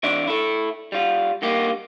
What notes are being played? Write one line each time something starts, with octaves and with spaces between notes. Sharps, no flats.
E3 D4 D5 E5
E4 A4
G3 F4
G2 A#3 G4